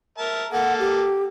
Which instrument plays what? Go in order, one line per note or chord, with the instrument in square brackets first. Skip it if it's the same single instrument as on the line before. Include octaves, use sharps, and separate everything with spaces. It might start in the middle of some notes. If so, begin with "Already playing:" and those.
[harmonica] A#4 E5 A5
[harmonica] A#3 A4 [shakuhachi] F#5
[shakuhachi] G4